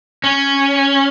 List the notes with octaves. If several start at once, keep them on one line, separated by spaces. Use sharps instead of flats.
C#4